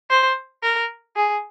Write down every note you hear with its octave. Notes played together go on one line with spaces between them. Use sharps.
C5
A#4
G#4